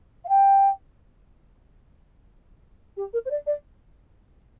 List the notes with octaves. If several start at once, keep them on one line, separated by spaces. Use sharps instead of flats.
F5
G5
G4
A#4
C5
D5
D5